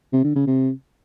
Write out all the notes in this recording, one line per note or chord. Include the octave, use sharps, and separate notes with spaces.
C3
D3
C#3
C3